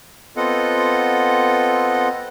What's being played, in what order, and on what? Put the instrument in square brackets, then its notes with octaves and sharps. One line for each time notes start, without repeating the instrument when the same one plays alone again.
[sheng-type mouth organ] B3 C4 F4 A4 D#5 F#5